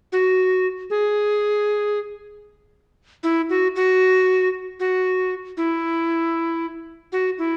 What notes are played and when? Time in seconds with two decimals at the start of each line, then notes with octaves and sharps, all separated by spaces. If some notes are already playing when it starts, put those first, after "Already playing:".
0.12 F#4
0.90 G#4
3.23 E4
3.50 F#4
3.76 F#4
4.80 F#4
5.57 E4
7.12 F#4
7.38 E4